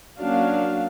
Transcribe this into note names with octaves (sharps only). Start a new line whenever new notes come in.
F#3 A#3 C#4 D4 F#4 F5